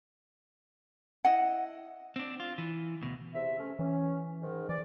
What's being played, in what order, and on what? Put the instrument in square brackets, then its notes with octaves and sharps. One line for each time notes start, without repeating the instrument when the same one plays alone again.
[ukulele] E4 D#5 F#5
[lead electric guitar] C4 D4
F4
E3
D2 B2
[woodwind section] E2 C3 E5
A3 C#4
[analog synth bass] E3 [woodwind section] C#4
[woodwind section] G#2 D#3
[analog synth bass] E3 [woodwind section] D5